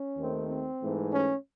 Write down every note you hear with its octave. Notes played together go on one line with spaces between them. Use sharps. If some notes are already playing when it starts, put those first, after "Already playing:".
Already playing: C#4
D#2 D#3 A3 C4
C4
G#2 E3 A3
C#4